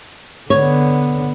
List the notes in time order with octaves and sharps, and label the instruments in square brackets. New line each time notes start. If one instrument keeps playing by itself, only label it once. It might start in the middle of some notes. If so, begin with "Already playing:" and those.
[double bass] D3 B3 [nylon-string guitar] C#5